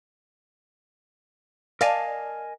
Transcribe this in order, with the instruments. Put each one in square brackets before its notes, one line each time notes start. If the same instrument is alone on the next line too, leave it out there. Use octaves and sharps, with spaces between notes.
[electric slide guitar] A#4 D#5 G#5 [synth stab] D5 F5 A5